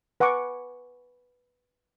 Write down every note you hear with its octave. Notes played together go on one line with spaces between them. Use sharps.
B4 F#5 G#5 C#6 D6